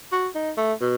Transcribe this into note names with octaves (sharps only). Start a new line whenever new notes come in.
F#4
D#4
A3
B2